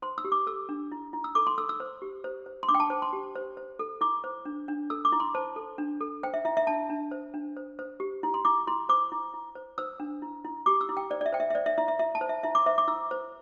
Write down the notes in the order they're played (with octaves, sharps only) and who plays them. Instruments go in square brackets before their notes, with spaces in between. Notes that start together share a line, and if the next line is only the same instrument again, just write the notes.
[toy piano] C5 C6
E6
G4
D6
A4 E6
D4
E4
E4
E6
A4 D6
C6
A4 E6
E6
C5
G4
C5
C5
C6
D4 D6
G5
A5
C5 A5
C6
G4
C5
C5
A4
E4 D6
C5
D4
D4
A4 E6
D6
E4
C6
C5 A5
A4
D4
A4
C5 G5
E5
E4 E5
E5
D4 A5
D4
C5
D4
C5
C5
G4
E4
C6
E4 D6
E4 C6
C5 D6
E4
E4
C5
C5 E6
D4
E4
E4
G4 D6
E6
E4
G5
C5 D5
D5
E5
C5 G5
E5
E5
C5 D5
E5
E4 E5
E5
E4 E5
A5
C5
E5
E4 E5
D6
C5 E5
D6
E4 E6
C5